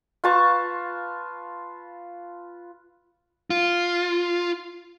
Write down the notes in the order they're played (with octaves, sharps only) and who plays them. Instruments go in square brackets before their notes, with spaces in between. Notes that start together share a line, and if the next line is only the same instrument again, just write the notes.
[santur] F4 B4 A5 C#6
[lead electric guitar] F4